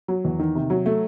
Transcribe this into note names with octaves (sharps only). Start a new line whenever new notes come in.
F#3
E2
D#3
C3
F#3
A3